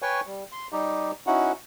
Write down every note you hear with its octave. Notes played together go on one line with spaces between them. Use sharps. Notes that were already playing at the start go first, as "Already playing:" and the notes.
B4 C#5 G5 G#5 C#6
G3
C6
G3 D#4 G4
C#4 D#4 E4 F#4 F#5